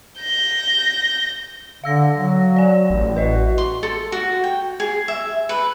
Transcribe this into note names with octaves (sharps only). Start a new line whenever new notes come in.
G6 A#6
D3 F5 E6 A#6
F#3
D5 G#5
A1
F#4 B4 D#5 E5
C6
A4
F#4
G5
G#4
E5
B4